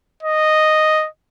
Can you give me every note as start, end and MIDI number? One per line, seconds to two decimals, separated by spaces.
0.23 1.07 75